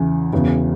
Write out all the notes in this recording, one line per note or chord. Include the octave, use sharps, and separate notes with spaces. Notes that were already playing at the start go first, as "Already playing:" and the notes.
Already playing: E2 C#3 E3 C#4
E1 E2 C#3 E3 B3